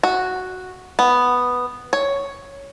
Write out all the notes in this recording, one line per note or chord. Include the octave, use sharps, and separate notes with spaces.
F#4
B3
C#5